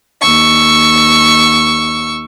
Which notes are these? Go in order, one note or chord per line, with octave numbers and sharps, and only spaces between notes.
D#2 C#6 E6